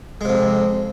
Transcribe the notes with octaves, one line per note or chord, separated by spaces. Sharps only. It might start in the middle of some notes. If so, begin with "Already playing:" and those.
F2 C3 G#3